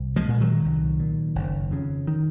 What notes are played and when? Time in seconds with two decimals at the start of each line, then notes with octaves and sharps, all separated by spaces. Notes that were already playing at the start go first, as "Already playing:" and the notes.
Already playing: C2
0.16 F3 G#3
0.28 A#2
0.40 D#3 F#3
0.64 C2
1.00 A#2
1.35 F#1
1.71 F2 C#3
2.07 D#3